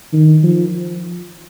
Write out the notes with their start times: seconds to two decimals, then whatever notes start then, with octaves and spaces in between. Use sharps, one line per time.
0.13 D#3
0.43 F3